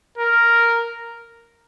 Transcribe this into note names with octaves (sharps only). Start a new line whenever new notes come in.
A#4